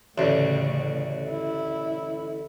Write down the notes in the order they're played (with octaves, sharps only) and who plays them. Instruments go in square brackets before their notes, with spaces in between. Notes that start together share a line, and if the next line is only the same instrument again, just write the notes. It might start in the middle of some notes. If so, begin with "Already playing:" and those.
[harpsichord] A1 D2 [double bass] A2 C#3
[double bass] E4